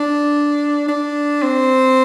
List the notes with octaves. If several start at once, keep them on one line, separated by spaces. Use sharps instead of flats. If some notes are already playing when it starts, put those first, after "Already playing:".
Already playing: D4
D4
C4